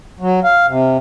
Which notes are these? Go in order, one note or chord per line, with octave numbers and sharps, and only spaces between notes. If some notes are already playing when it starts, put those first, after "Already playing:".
F#3
F5
C3